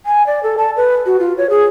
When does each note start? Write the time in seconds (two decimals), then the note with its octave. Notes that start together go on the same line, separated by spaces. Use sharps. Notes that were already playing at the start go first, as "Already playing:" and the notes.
0.06 G#5
0.27 D5
0.43 A4
0.58 A5
0.77 B4
1.06 F#4
1.20 F4
1.38 C#5
1.50 G#4